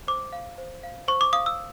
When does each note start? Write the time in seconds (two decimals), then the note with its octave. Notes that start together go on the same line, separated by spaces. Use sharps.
0.08 C5 D6
0.33 F5
0.58 C5
0.83 F5
1.08 C5 C#6
1.21 D6
1.33 F5 D#6
1.46 E6